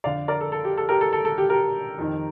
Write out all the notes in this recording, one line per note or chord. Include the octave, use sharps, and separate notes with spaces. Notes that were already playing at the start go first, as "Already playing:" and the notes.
F2 D3 D5 F5
A#4 D5
A4
A4
G4
A4
G4 A#4
A4
A4
A4
G4
G4 A#4
F2 D#3